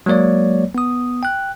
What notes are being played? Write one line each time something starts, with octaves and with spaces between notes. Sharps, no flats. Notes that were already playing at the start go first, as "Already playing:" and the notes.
F#3 G#3 A#3 C#5 D5
B3 D#6
G5 F#6